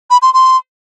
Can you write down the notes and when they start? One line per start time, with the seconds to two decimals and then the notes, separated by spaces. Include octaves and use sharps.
0.10 B5
0.22 C6
0.34 C6